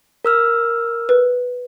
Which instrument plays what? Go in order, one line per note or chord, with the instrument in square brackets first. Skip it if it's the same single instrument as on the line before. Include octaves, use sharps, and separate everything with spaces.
[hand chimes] A#4 E6 F6
[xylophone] B4